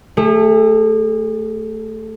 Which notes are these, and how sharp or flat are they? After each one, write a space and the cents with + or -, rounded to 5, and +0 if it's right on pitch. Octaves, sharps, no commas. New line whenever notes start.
A3 +0 G#4 -40